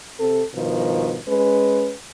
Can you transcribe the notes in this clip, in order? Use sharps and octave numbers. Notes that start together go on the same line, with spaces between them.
C3 A4
G2 B2 D#3 F3
G#3 C#4 B4